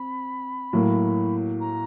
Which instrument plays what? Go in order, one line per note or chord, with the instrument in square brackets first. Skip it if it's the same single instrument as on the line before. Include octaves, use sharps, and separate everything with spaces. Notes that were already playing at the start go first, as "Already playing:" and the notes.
Already playing: [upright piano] C4 [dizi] B5
[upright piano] A2 F#3 A#3
[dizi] A#5